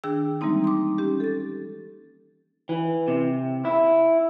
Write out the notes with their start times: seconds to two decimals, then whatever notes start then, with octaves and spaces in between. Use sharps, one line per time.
0.04 D#3 D4 G#4 G5 E6
0.41 E3 G3 G#3 A#3 C4 D#4
0.64 C6 D6
0.98 C#4 G4
1.20 A4 A6
2.69 E3
3.08 C3
3.65 E4